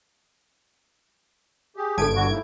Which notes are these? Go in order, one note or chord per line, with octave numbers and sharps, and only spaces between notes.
G4 G#4
G1 A4 A5 G#6 D7
D3 F#4
D#2 G#2 E4